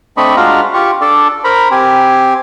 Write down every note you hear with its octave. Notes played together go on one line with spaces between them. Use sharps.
A3 C4 D4 D#5 B5 C#6
G#3 D4 F4 F#4 F5 A#5
F4 G4 C#6
D4 A4 D5
A#4 C5 A#5 B5
C4 G4 G#5